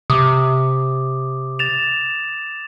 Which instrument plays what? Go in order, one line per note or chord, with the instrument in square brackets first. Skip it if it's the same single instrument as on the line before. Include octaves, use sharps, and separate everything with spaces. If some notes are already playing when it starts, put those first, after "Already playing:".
[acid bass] C3 [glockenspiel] D6 D#6
[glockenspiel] A6 E7 F7